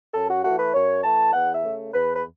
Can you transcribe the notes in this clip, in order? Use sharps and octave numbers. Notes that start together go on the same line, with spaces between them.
F#2 A4
F#4
E3 A3 F#4
B4
F#2 C#5
E3 A3 A5
E2 F#5
E5
C#3 A3
E2 B4
B4